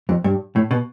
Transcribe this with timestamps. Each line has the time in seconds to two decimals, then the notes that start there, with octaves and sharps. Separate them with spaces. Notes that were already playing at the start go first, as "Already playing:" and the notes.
0.09 F2
0.24 G2
0.56 A2
0.71 B2